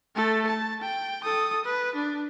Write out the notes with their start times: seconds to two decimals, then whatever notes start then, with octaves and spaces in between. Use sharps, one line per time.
0.16 A3 A4
0.47 A5
0.82 G5
1.24 A4 D#6
1.65 B4
1.95 D4